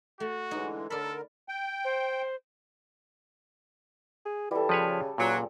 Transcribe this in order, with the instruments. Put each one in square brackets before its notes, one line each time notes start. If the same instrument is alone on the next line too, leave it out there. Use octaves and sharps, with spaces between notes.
[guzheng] A3 [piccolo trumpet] F#4
[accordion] D3 E3 G#3 [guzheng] D#4
[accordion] D3 A#4 [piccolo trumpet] A4 [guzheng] D5 B5
[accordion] G5
[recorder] C5
[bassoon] G#4
[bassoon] E3 [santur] G3 A4
[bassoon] C#3 [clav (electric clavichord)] F3 B4 C#5
[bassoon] C#2 [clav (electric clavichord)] A#2 [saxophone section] F#3